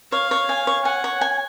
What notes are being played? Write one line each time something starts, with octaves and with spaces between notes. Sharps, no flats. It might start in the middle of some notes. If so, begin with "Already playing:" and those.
C#5 F5
C#5
G#5
C#5
F#5 G#5
C#5
G#5